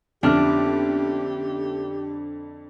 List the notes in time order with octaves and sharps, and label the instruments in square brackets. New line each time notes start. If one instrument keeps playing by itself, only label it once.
[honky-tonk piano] F2 D3 F6 [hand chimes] B3 C#4 E5 [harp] D4 [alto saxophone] G4